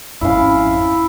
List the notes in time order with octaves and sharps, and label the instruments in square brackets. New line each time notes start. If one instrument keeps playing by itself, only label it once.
[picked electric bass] G#1 F2 C#4 [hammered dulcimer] E4 F5